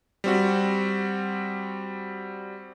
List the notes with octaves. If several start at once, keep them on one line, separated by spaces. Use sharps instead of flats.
G3 C4 F#4